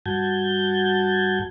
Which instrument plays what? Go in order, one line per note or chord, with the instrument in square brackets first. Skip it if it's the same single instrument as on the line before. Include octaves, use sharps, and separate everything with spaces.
[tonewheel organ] G2 F#4 A5 G6 G#6